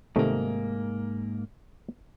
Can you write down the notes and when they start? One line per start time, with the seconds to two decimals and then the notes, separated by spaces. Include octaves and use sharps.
0.16 G#2 C3 D#3 A3 A#3